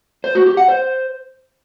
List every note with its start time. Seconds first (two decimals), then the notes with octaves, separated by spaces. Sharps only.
0.24 C5
0.35 F#4
0.46 G4
0.57 F#5
0.68 C5